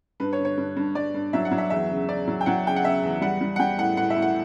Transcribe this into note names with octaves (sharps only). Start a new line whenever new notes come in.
G2 B4
C#5
D3
C#5
G2
G2
G2 D5
G2
F#3 E5
F#5
F#3
E5
E2 E5
C#3
C#3 D5
F#3
G5
F#3 F#5
C#3 G5
F#5
C#3 E5
E2
G3 F#5
G3
F#5
G3 G5
A2 F#5
A2 F#5
E5
A2
F#5